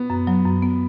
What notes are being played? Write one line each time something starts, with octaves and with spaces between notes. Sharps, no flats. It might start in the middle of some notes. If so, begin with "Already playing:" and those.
Already playing: B3
F#2
F#3
F#2
B3